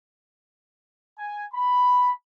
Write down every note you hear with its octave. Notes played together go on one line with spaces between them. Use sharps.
G#5
B5